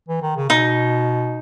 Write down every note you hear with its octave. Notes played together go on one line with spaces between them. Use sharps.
E3
D#3
C#3
B2 D#4